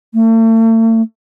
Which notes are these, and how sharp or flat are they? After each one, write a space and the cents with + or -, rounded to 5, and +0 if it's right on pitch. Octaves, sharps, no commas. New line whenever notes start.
A3 +40